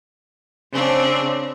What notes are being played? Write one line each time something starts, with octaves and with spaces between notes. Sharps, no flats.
C#3 C4 D4 G#4